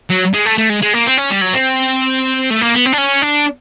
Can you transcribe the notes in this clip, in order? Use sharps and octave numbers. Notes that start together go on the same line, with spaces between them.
F#3
G#3
A3
A3
G#3
G#3
A#3
C4
C#4
G3
F#3
C4
A3
A#3
B3
C4
D4
C#4
D4